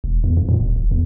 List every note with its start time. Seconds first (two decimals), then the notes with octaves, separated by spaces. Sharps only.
0.04 E1
0.24 E2
0.37 F2
0.49 A#2
0.60 D#1
0.76 D#1
0.91 E2